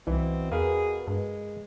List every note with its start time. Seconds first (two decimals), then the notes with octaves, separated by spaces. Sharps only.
0.07 C2 B2 E3 C4
0.51 E2 G#4 A#4 B4 F5
1.07 G2 G#3